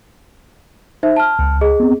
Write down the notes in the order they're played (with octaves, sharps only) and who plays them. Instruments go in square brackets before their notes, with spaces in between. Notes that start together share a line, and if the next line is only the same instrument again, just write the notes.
[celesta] D#4 C5 E5
A5 F6
[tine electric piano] C#2
[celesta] G#4 D#5
[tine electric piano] B3 C4